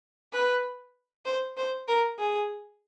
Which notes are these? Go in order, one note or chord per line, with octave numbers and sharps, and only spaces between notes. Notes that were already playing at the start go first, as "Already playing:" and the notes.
B4
C5
C5
A#4
G#4